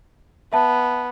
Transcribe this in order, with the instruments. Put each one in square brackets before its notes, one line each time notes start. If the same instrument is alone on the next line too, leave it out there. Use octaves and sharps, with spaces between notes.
[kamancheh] B3 [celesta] E5 A5